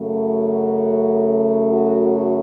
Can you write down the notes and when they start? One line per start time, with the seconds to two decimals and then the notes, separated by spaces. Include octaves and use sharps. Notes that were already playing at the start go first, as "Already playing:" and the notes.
Already playing: F#2 C#3 A3
0.35 F#4
1.72 F#4
2.02 F#4